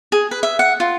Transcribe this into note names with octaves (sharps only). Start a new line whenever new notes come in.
G#4
B4
E5
F#5
F4